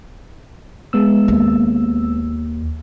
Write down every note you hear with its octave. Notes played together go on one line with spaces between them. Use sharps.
G#3 B3 E6
D#2